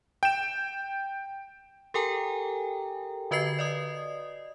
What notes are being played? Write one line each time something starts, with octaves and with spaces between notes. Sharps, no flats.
G5 E7
G4 A4 A#4 G5 G#5 A#5
D3 F#4 B4 D#5 G#6 C7
D5 D#5 D#6